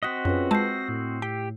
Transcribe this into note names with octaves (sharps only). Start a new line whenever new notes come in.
C4 F#4 D#5 D#6 F#6 B6
F#2 C#4 F4 G#4 B4
G#3 A5 E6 G6 A#6 C7
A2
G4 G5